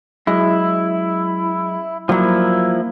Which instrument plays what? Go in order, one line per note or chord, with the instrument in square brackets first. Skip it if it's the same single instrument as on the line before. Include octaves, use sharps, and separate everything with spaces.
[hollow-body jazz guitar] F#2 G#3 [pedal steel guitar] E4
[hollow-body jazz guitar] G2 F#3 [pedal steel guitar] F3 A#3 E4